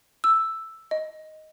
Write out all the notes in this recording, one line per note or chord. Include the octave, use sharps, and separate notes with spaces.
E6
D#5